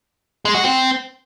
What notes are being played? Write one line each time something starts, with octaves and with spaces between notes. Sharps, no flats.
G#3
F#4
C4